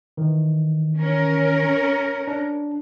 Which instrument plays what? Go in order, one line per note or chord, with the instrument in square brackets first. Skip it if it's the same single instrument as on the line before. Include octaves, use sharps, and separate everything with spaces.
[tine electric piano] D#3 E3
[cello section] C#4 A#4
[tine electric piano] D4